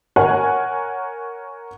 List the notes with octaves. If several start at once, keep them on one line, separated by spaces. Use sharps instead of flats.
A#4 C#5 F#5 G#5